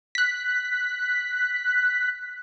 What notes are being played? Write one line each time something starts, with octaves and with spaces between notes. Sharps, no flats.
F#6 B6